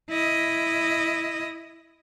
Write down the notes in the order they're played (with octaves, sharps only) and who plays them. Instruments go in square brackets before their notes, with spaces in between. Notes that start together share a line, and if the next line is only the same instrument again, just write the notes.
[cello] E4 D#5